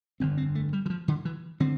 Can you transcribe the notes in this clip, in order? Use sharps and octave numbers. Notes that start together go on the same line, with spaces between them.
G1 F2 D3 C4
C4
A3
G3
E3
F3
D3
E3
D3 C4